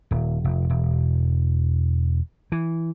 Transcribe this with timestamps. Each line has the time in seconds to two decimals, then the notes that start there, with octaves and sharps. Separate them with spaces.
0.11 D#1
0.44 F1
0.70 E1
2.52 E3